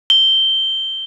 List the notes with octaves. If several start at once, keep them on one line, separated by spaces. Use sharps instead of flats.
G7